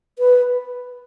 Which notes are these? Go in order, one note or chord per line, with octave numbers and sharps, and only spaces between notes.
B4